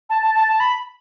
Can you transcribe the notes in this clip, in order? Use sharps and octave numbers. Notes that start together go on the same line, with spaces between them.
A5
A5
A5
A5
B5